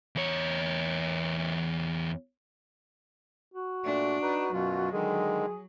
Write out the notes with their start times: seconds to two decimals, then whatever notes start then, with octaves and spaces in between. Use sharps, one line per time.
0.16 E2 C#5
3.54 F#4
3.84 A#2 A3 D4
4.22 D#4 B4
4.53 F#2 B2 F#3 F4
4.93 D3 D#3 G#3 G#4